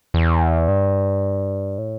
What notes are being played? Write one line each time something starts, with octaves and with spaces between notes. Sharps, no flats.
E2
G2
A2